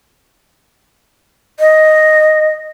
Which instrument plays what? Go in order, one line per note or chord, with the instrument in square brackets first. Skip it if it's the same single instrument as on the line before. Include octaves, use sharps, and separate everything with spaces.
[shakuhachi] D#5